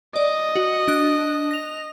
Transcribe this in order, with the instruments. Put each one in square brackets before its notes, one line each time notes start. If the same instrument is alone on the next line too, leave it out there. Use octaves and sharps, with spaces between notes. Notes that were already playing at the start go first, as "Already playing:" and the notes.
[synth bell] D5 [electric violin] D#5
[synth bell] F#4
D4 D#6 F#6
A#6 F7